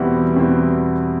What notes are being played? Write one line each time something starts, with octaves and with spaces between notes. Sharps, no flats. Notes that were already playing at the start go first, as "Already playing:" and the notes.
Already playing: E2 B2 G3 C4 E4 F#5
E2 B2 G3 C4 E4